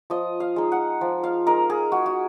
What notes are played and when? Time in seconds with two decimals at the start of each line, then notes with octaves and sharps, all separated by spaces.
0.10 F3 D#5
0.40 F5
0.56 G#3 D#4
0.72 F#5
1.01 F3
1.24 F5
1.47 G#3 D#4 A#4
1.70 G#4
1.92 G#3 F#4
2.06 F#4